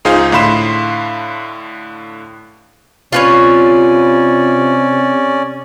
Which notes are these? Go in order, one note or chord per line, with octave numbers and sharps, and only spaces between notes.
C#2 D#4 F4 G#4 C5 F5
A2 D3 F5 B5 C6 E7
C3 C#4 F4 B4 C#5 D5